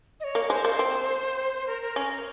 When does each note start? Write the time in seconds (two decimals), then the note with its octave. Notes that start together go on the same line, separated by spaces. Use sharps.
0.20 D#5
0.24 C#5
0.35 A#3
0.50 G#3 C5
0.65 A#3
0.79 C4
1.67 A#4
1.82 A#4
1.96 C#4 A#4